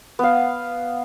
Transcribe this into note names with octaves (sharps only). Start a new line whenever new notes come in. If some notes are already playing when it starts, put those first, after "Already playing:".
B3 F5